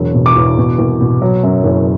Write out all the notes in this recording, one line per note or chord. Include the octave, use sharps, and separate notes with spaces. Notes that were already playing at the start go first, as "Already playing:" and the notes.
Already playing: E1 F#3
B2
D6
E2
B2
C2
B2
F#3
F#2
F#1